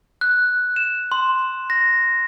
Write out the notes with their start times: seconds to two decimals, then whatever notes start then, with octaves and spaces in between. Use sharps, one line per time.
0.21 F#6
0.76 E7
1.12 C6
1.70 A#6